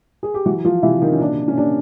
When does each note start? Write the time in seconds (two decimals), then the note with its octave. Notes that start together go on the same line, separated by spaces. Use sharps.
0.23 G#4
0.34 G4
0.46 E3 F#3 F#4
0.65 F3 F4
0.83 C3 E3 E4
1.01 D#3 D#4
1.12 C#4
1.20 A#2 D4
1.48 C#4
1.57 A#2 D4